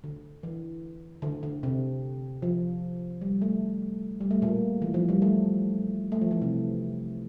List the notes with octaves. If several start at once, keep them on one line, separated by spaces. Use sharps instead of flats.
D3
E3
D3
D3
C3
F3
G3
A3
G3
A3
A#2 A#3
E3
F3
G3
A3
A3
F3
E3
C3